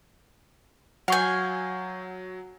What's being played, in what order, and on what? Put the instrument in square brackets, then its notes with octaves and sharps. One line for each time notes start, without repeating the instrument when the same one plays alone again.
[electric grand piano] F#3 [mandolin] F5 G#5 [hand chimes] F#5 C#6 G6